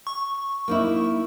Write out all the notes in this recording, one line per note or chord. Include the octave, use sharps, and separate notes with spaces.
C#6
A#3 D#4 E4